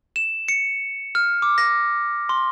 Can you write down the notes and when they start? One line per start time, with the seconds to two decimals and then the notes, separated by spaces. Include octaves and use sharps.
0.16 E7
0.48 C#7
1.15 F6
1.42 D6
1.58 A#6
2.29 C6